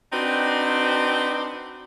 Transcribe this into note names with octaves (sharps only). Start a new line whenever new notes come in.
C4 D4 D#4 F#4 B4